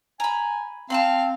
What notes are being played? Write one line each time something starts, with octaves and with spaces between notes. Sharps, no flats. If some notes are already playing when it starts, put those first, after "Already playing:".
G#5 A#5 B5
C4 F5 A5 B5 C6